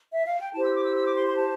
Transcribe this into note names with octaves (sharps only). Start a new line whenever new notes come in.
E5
F5
G5
E4 G4 C5 A5
E6
D6
E6
E6
D6
C6
C6
A5